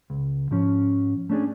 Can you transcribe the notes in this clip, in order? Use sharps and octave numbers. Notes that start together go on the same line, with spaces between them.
C#2
G#2 F3 C#4
A3 C#4 D4 G#4